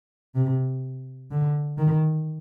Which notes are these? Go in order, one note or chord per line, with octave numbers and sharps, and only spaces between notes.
C3
D3
D#3